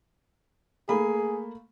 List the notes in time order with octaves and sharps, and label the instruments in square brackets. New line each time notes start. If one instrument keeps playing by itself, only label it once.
[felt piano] A3 A#3 B5 [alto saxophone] G#4